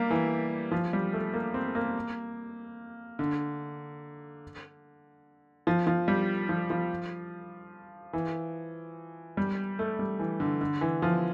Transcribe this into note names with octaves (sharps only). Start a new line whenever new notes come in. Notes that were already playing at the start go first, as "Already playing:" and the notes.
Already playing: G3 A#3
E3
F3
G3
A3
A#3
C4
A#3
D3
F3
F3
G3
F3
F3
E3
G3
A3
G3
E3
D3
D3
E3
F3